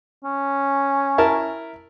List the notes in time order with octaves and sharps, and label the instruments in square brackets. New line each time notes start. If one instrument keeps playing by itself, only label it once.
[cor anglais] C#4
[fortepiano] E4 A#4 A5